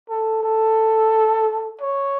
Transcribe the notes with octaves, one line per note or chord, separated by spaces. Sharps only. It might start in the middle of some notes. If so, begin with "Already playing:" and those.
A4
A4
C#5